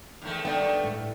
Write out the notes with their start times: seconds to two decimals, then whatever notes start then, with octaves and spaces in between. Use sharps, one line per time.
0.22 E2 D#3 A3
0.45 G2 D#3 A3 B3 D5 G5
0.84 A2